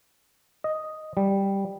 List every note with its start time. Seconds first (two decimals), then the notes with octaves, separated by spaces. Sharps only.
0.64 D#5
1.17 G3